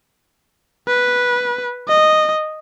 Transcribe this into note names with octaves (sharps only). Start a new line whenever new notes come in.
B4
D#5